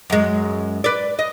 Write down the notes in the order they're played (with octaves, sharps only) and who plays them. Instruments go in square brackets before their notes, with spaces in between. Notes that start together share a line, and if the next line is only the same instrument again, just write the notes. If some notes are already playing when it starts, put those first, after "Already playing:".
[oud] F#2 G#3
B4 D5
D#5